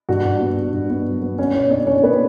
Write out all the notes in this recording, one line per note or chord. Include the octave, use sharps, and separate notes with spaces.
G2 F#4
G2
B3
D4
G2
B3
F#3
B3
C#4 C#5
B2 C#4 C#5
C#4 D4 D5
C#4 C#5
A#3 B3 B4